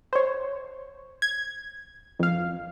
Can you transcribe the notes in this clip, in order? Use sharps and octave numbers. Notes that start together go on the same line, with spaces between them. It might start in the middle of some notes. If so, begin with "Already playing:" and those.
C5 C#5
G#6
F2 F5